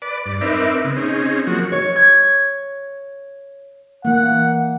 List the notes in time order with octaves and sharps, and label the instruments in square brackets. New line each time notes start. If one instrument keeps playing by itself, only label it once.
[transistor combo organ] B4 D5 D6
G2 D5
C4 D#4 A#4 B4 E5 D6
C#3 B3
C4 C#4 D#4 G#4
F3 F#3 A#3 F#4
[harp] C#5
G#6
[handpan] E3 A#3 [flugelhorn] F#5